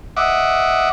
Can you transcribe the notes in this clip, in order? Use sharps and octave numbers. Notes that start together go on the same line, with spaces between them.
D#5 E5 F#5 D6